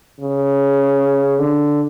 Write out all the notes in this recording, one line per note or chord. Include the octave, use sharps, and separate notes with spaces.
C#3
D3